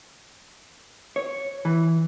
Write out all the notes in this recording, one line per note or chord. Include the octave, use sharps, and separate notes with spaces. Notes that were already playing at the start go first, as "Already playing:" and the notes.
C#5
E3